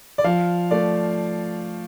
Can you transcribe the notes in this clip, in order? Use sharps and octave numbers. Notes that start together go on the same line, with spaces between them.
D5
F3 F5
A3 D5